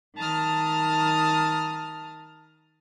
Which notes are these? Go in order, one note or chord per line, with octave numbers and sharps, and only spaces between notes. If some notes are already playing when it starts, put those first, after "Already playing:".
D#3 A5 A#5 D#6 F6